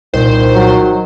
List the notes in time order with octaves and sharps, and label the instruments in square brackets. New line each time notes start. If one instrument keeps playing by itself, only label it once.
[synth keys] C2 A#2 [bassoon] D#3 [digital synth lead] C5
[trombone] F#3